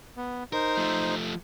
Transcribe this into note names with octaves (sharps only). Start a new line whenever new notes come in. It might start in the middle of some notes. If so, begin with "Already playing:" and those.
B3
D#4 A#4 C5
F3 A3